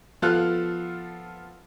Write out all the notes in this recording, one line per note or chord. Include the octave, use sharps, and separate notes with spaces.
F3 B3 F4 A4 F6 F#6